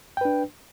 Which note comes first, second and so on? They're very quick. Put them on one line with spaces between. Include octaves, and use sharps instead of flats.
G5 B4 D4